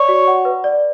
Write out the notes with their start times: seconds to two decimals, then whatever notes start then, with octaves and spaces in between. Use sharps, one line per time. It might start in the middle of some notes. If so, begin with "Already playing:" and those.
Already playing: C#5 D5
0.09 F#4
0.27 F#5
0.45 B4
0.64 D5